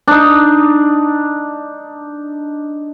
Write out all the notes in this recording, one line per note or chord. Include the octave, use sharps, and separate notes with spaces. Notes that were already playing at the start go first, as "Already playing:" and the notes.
D4 D#4